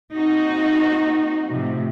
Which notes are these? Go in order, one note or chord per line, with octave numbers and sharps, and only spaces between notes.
A#3 C4 D#4 F#4
A2 C3 F3